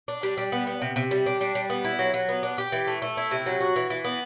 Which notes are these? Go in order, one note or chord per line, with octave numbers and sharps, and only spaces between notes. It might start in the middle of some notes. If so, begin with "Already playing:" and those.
D4
G3
G3
B3
B3
C3
C3
G3
D4
G3
G3
B3
E4
F#3
F#3
B3
D4
G4
E3
A3
A3
E4
C3
F#3
F#4
E3
E3
B3